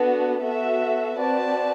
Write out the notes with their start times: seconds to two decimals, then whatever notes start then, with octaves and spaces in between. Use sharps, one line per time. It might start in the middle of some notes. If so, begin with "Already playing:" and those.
Already playing: B3 D4 F#4 A4
0.41 B3 F#4 A4 E5
1.17 C4 F#4 B4 D5 A5